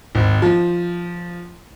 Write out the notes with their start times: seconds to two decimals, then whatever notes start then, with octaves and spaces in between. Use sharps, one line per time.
0.15 G#1
0.42 F3